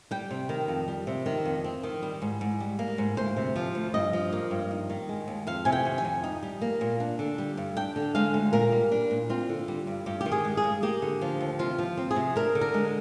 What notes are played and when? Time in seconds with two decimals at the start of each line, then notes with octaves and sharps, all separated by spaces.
0.11 G3 G5
0.31 C3
0.49 D#3
0.68 F2
0.88 G3
1.07 C3
1.26 D#3
1.45 F2
1.64 C4
1.83 D#3
2.02 G3
2.22 G#2
2.41 G#2
2.60 G3
2.79 A#3
2.98 G#2
3.17 D2 C5
3.37 C3
3.56 F3
3.75 D2
3.94 G2 D#5
4.13 F3
4.32 A#3
4.51 G2
4.71 D#4
4.89 D#3
5.09 G#3
5.28 D#2
5.47 F2 F5
5.65 C3 G#5
5.72 G5
5.85 D#3
5.98 G#5
6.05 F2
6.24 D#4
6.43 G3
6.61 A#3
6.81 A#2
7.00 D4
7.19 D3
7.38 G3
7.57 G2
7.77 D4 G5
7.96 D3
8.15 G#3 F5
8.34 D2
8.53 A#2 A#4
8.72 G3
8.92 D4
9.11 A#2
9.30 C4 F4
9.49 D3
9.68 G3
9.87 G2
10.06 G2 G4
10.21 G4
10.26 D#3
10.32 G#4
10.45 G#3
10.57 G#4
10.64 G2
10.82 A#3 G4
11.02 D3
11.21 F3
11.41 D#2
11.59 C3 F4
11.78 F3
11.97 C4
12.11 G#4
12.16 C3
12.36 D4 A#4
12.55 D3
12.61 A#4
12.74 G#3